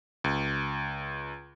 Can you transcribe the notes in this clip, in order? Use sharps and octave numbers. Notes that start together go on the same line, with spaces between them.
C#2